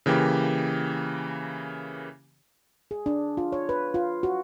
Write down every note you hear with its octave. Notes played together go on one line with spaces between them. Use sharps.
C#3 E3 A#3 G4
G#4
D4
F4
C#5
B4
F4
F#4